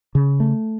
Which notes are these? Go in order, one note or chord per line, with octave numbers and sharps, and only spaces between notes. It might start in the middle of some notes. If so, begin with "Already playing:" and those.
C#3
A3